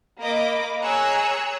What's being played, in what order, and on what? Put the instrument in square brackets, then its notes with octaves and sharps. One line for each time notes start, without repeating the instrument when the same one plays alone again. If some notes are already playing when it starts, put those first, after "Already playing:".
[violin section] A#3 D#5 B5 D6
G#4 C#5 G#5 A#5 E6 F#6